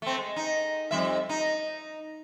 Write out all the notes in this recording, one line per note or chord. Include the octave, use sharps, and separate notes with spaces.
A3 C4
G#3
D#4
F2 G3 E5
D#4